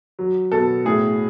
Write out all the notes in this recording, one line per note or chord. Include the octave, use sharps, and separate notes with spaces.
F#3
B2 A4
A2 G#4